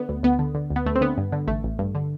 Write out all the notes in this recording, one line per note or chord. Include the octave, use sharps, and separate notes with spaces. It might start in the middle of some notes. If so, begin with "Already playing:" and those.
Already playing: D3 B3
D2
D2 B3
D3
D3
D2
B3
D2 A3
C4
D3 B3
G2
D3
A1 A3
A1
G2
D3